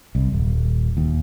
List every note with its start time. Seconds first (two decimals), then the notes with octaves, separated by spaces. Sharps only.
0.15 C2
0.32 D#1
0.97 D#2